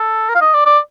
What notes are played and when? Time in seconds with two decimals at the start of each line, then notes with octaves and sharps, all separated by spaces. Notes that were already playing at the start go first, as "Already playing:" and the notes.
Already playing: A4
0.29 A#4
0.35 F5
0.41 D#5
0.54 D5
0.66 D5